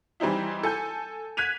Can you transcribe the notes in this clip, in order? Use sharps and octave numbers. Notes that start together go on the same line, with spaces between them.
E3 G3 C4 D#4 E4
A4 G#5 G6
F#6 G#6 B6 D#7 F7